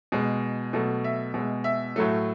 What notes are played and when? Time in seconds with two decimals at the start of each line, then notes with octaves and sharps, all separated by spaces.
0.12 B2 G#3
0.73 B2 F#3 A3
1.04 E5
1.34 B2 G#3
1.64 E5
1.96 A2 F#3 A3